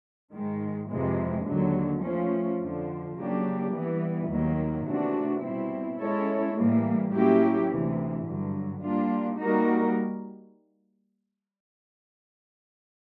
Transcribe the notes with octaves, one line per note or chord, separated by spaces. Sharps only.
G#2 D#3 G#3
F2 C3 E3 G#3
D#2 D3 F#3
F3 A3 C#4
F2 D3 F3
C#3 F#3 A#3 D4 G4
E3 G3 B3
D#2 D#3 F#3 A#3
C3 E3 A3 D4 F#4
B2 G3 C4 E4
G#3 C#4 E4 A4 C#5
A2 E3 G3 A#3
F#3 A#3 C#4 E4 G4
D2 C3 E3
G2 D3 F#3
G3 A#3 D4 F4
G3 A#3 D#4 F#4 A#4